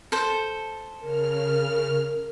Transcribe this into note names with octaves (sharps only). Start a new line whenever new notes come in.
A4 C5
C#3 A#4 F6